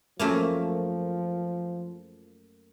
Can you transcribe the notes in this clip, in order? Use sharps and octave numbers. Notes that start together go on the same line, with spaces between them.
F#2 F3 A3 A#3